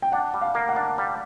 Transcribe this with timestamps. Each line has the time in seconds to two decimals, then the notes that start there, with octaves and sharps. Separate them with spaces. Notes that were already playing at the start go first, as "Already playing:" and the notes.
0.02 G5
0.12 D4 F#5
0.34 G3
0.41 F5
0.55 A#3
0.69 F#5
0.76 D4
0.98 G3